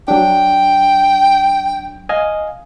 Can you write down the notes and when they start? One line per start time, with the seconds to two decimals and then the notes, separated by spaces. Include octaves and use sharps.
0.08 F#3 D4 G5
2.09 D#5 F5 G#5